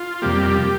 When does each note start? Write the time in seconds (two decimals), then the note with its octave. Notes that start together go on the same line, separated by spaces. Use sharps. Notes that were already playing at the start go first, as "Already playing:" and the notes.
Already playing: F4
0.22 F2 C3 G3 A#3 G4